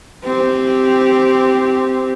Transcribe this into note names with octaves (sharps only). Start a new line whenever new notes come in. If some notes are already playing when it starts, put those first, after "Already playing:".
C4 G4